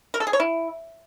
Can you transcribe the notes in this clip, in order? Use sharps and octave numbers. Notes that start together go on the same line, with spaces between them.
A#4
A4
G#4
C#5
E4